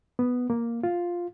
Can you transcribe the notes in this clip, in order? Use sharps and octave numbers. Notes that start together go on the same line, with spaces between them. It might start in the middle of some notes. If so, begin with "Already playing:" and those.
B3
A#3
F4